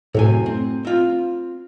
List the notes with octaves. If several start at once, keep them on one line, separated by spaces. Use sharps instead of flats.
F#2 A2 C3 G#5
C4
C4 F4